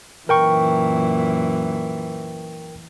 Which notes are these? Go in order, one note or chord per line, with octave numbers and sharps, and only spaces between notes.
F#2 A#2 E3 A#4 G5 C#6